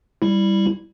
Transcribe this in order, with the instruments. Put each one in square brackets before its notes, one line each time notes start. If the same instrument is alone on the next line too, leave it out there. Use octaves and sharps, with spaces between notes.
[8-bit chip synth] G3 E4